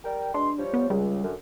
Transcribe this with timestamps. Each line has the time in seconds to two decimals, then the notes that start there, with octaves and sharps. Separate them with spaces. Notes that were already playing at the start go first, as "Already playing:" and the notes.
0.04 G3 A#4 G5
0.34 B2 G#3 D4 C6
0.59 F3 G3 C#5
0.73 B3
0.90 C#2 G3
1.24 F#2 D3